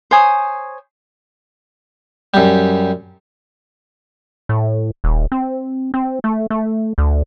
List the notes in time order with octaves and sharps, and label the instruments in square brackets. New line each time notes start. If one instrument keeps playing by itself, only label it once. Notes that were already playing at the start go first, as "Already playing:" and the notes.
[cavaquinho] C5 C#5 G#5 D#6
[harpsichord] F#2 G3
[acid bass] A2
D#1
C4
C4
A3
A3
D2